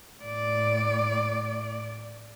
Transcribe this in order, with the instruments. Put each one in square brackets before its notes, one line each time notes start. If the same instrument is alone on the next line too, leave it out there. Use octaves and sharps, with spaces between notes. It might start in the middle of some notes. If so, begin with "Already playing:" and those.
[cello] A2 D5